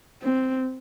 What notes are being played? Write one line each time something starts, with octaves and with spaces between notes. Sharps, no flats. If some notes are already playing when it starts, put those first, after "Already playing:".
C4